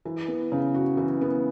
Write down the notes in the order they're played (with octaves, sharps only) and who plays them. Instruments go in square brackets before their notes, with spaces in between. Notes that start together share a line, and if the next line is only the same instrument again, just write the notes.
[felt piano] E3
B3
C#3
F#4
E3
B3